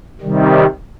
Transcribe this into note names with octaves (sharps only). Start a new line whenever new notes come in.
C3 D#3 G3